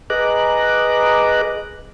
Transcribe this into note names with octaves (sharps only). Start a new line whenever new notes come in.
G#4 B4 D#5 A#5 D6 F#6